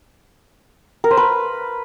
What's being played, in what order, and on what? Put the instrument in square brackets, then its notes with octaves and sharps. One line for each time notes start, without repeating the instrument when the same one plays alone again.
[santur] A#4
C5
B4